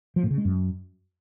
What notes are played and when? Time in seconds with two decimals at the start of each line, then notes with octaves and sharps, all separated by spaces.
0.16 F3
0.23 A2
0.31 C#3
0.38 G#3
0.45 F#2